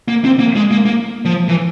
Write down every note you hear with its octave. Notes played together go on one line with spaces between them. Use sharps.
A#3
C4
A#3
G#3
A#3
A#3
F3
E3